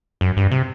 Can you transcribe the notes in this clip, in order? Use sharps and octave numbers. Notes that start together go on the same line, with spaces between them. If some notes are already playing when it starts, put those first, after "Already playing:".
F#2
G2
C3